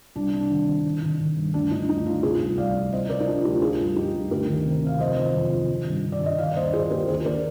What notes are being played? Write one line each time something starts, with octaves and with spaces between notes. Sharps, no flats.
C2 D4
C3
D4
D#3
C3
D#3
D#3
D#3
G2
D2 D4
D2 D#4
D2 D#4
D2 D4 F4
C3 F4 G#4
C2
C2 D5 F5
F3
C3 C5 D#5
C3 A#4 D5
D#4
F3 D4 F4
D2 D#4 G4
F3 F4 G#4
G2
F3 D#4 G4
G2
D2 G4 A#4
D#3
C3
C3 F5
F2 C5 D#5
D#3
F2
F2
D#3
G2
D#3
D5
G2 D#5
D#3 D5 F5
D5
D#2 C5 D#5
D#3 G#4 C5
D#2 G4 A#4
D#2 G#4 C5
D#2 A#4 D5